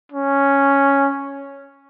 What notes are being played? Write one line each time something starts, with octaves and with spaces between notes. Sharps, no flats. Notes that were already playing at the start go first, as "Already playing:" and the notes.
C#4